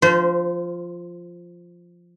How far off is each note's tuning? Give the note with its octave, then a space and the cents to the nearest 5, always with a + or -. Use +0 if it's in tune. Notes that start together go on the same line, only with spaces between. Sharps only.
F3 +0 C5 -30